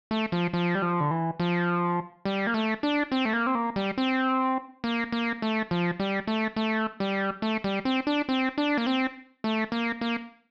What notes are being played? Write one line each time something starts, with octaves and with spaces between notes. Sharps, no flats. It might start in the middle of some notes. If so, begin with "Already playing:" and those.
A3
F3
F3
G3
F3
D3
E3
F3
G3
A#3
A3
D4
C4
A3
A#3
C4
A#3
G3
C4
A#3
A#3
A3
F3
G3
A3
A3
G3
A3
G3
C4
D4
C4
D4
A#3
C4
A3
A#3
A#3